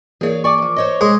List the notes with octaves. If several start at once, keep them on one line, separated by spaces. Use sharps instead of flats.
E3 A#3 G#4 C#5 D5
D5 G#5 C#6 D6
E2 F3
C5 C#5 D#5
G#3 G#4